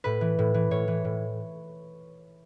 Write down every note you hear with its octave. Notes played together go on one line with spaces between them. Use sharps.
A2 B4
E3
A2
E3
A2 C#5
E3
A2